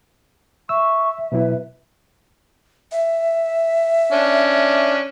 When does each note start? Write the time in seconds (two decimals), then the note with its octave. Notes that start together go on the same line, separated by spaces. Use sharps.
0.69 E5 C#6 E6
1.32 B2 F#3 E4 B4
2.92 E5
4.12 C#4 D4